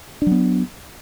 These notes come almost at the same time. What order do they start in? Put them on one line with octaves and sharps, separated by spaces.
D4 F#3 B3